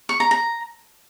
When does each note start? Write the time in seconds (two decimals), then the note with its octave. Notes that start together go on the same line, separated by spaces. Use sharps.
0.09 C#6
0.20 A#5
0.31 A#5